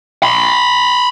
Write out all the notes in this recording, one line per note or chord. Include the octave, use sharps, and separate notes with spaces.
B5 C6